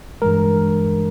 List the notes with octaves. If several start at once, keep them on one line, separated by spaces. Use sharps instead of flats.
G2 E3 G#3 A#4